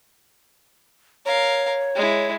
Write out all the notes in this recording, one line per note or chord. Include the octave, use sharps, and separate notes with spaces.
A#4 C#5 F5
G#3 E4